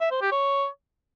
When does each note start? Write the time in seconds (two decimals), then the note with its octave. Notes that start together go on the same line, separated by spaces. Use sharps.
0.01 E5
0.11 C5
0.21 G4
0.32 C#5